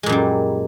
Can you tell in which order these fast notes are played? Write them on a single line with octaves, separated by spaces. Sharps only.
G#3 A#2 F#2 G3